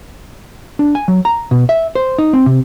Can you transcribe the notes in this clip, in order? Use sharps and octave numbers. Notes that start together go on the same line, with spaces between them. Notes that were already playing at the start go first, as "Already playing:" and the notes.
D4
G#5
F#3
A#5
B2
E5
C5
D#4
C4
C3